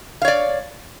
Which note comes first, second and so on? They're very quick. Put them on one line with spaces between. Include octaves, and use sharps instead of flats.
F5 C#5 D5